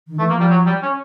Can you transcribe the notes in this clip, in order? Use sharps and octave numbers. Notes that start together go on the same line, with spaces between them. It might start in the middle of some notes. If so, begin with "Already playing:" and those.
D#3
E3 A3
A#3
F3
G3
F#3
G3
C#4